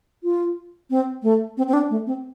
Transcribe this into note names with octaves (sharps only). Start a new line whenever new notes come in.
F4
C4
A3
C4
C4
D4
A3
C4